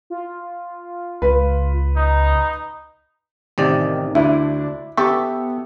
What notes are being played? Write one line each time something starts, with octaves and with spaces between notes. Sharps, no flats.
F4
C#2 B4
D#4
A1 C3 D#3 D5
D2 D4 E4
B3 G4 A4 E5 C#6